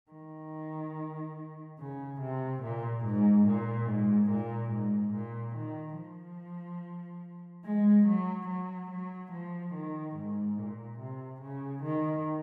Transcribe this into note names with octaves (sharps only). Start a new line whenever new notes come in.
D#3
C#3
C3
A#2
G#2
A#2
G#2
A#2
G#2
A#2
D#3
F3
G#3
F#3
F#3
F#3
F3
D#3
G#2
A#2
C3
C#3
D#3